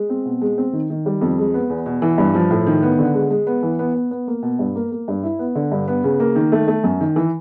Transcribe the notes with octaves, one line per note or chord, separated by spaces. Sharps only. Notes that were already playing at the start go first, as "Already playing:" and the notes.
Already playing: G#3
C4
B2
G#3
C4
D#3
D#3
G3
F2
G#3
B3
E2
B2
E3
G2
F3
A2
D#3
B3
D3
G#3
G#3
B3
E3
B3
B3
B3
A#3
B2
G2
A#3
A#3
G2
E4
B3
D3
G2
B3
C#3
A#3
D#3
A3
A3
F#2
D#3
E3